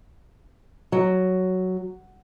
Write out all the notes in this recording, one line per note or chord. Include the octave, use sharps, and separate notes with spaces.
F#3